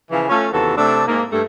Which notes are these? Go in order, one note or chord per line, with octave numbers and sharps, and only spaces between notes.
C#3 E3 F3
A3 C#4 F4
D#2 C3 E3 B3 F#4 A4
C3 A3 C4 D4
G#2 A#3
G2 A3